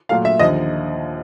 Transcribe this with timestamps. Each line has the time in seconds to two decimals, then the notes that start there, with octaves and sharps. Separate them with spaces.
0.09 A#2 F#3 A3 F5
0.25 E5
0.39 D#2 D3 F3 D#5